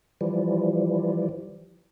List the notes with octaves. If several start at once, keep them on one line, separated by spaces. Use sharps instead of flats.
E3 F3 G3